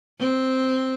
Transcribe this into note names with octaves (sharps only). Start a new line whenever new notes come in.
C4